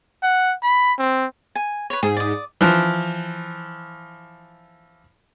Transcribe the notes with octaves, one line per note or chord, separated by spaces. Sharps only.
F#5
B5
C4
G#5
B4 C#5
G#2 G#4
D5 D#6
E3 F3